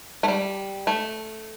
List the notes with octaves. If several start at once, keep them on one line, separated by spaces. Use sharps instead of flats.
A3
G3
A3